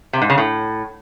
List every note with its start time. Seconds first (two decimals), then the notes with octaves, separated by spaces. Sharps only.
0.13 C3
0.22 G#2
0.30 C#3
0.38 A2